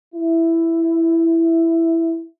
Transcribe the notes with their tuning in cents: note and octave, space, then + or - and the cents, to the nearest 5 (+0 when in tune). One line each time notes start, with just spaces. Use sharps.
E4 +5